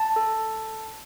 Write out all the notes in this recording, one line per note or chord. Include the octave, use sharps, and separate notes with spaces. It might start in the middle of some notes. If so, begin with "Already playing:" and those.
Already playing: A5
A4